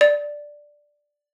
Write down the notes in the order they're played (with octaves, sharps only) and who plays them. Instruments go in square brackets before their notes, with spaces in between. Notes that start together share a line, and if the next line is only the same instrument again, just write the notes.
[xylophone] D5